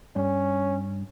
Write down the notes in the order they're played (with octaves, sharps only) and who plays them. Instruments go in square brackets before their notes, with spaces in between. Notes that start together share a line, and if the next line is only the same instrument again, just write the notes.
[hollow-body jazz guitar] G2 [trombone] C#4